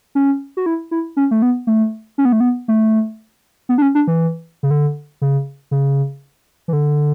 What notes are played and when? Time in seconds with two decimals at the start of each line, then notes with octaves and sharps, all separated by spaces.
0.15 C#4
0.57 F#4
0.66 E4
0.91 E4
1.17 C#4
1.31 A3
1.42 B3
1.67 A3
2.18 C#4
2.25 B3
2.32 A3
2.40 B3
2.68 A3
3.69 B3
3.78 D4
3.82 C#4
3.95 D4
4.07 E3
4.63 C#3
4.71 D3
5.22 C#3
5.71 C#3
6.68 E3
6.73 D3